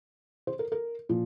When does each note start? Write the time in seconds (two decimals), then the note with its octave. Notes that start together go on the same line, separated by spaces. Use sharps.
0.47 C5
0.59 A#4
0.72 A#4
1.09 A#2 F3